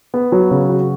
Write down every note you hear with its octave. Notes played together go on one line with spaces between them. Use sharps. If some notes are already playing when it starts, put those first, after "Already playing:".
B3
F#3
C#3
F#4